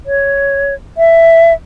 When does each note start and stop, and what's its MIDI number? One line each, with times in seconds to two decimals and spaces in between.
0.06 0.74 73
0.98 1.53 76